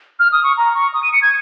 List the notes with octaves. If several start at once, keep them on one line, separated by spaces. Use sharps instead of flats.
F6
D#6
C#6
A#5
C#6
D#6
D#7
C#7
G#6